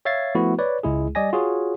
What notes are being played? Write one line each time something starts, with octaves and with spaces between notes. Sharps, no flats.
C#5 E5 F5 G#6 A6 C7
F3 A3 B3 E4 F#4
B4 C#5 D5
C#2 G#3 E4 G#4
G3 D5 D#5 G#5 A#6
F4 F#4 G#4 C#5